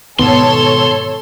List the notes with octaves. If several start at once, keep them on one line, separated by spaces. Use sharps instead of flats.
G#2 B2 D#3 B3 A4 C#5 C6